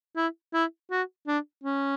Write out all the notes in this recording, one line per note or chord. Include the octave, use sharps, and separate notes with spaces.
E4
E4
F#4
D4
C#4